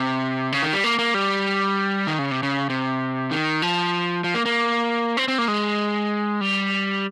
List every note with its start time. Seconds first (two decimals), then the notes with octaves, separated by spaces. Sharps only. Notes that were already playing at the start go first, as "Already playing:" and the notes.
Already playing: C3
0.52 C#3
0.62 D#3
0.73 G3
0.84 A#3
0.99 A#3
1.14 G3
2.07 D#3
2.19 C#3
2.31 C3
2.43 C#3
2.70 C3
3.31 D#3
3.62 F3
4.24 F3
4.35 A#3
4.46 A#3
5.17 C4
5.28 C4
5.38 A#3
5.48 G#3
6.41 G3